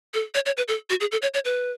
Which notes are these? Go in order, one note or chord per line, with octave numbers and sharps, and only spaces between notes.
A4
C#5
C#5
B4
A4
F#4
G#4
A4
C#5
C#5
B4